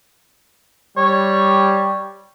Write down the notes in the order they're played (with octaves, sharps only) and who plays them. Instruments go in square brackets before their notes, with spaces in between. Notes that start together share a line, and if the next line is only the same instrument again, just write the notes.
[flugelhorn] G3 [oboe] C#5